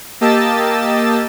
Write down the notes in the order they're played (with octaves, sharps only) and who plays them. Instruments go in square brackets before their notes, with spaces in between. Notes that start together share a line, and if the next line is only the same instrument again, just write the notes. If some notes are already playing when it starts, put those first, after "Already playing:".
[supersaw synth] A#3 G4 D#5 A5 E6 A6